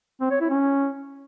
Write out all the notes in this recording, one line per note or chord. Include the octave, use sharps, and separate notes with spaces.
C4
C#5
E4
C#4